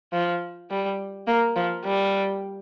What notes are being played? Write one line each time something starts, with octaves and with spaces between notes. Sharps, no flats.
F3
G3
A#3
F3
G3